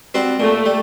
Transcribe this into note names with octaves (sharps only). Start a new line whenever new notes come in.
G3 C4 F#4
A#2 A3
G3